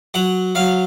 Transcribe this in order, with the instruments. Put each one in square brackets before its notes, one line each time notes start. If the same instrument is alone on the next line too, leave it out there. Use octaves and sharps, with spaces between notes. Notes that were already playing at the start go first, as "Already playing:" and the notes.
[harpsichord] F#3 F#5
F#3 F5